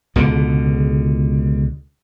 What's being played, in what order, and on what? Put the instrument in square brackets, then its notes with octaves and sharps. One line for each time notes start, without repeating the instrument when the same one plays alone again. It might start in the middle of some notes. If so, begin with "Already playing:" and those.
[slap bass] C#2 B2 D3